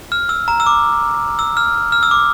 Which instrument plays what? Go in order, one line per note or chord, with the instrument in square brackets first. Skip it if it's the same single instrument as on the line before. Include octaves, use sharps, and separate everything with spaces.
[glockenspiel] F6
E6
A#5
E6
D6
E6
F6
F6
E6
D6